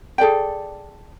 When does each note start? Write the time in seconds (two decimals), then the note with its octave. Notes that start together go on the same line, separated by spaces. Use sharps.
0.18 G#4 A4 D5 G5